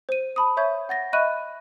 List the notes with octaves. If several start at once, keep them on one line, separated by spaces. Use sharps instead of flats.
C5 D#7
A5 B5 D#6
C#5 E5 C#6 G6 G#6
F#5 A6 A#6
D#5 E5 B5 C#6 F#6 D#7